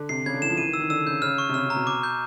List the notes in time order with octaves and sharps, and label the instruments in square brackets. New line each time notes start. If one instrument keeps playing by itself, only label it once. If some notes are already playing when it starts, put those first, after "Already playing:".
Already playing: [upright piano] D3
[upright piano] C3 [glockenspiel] C7
[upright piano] C#3 [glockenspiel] G#6
[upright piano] D3
[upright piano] E3 [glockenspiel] E7
[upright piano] F3
[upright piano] E3 [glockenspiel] D#7
[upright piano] D#3
[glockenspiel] E6
[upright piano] D#3
[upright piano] D3 [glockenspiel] E6
[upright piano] C#3 [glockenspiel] G6
[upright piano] C#3 [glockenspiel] F6
[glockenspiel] C#6
[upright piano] C3
[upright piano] C#3 [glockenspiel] F6
[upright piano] C3 [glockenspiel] A#5
[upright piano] B2
[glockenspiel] D6
G6